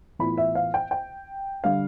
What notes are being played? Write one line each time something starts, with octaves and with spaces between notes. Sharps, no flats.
A2 E3 B3 F4 B5
E5
F5
G5
G5
D3 G3 D4 F5